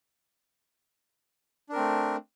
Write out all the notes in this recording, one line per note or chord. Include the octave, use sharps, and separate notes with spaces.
A3 C4 D4 A#4